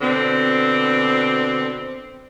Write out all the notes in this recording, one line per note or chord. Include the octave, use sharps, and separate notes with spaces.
B2 D3 C4